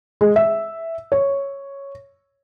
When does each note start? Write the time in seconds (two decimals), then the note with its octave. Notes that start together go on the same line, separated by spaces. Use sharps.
0.21 G#3
0.36 E5
1.12 C#5